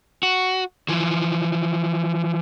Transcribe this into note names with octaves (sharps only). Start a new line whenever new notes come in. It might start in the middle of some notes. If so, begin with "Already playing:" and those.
F#4
E3 F3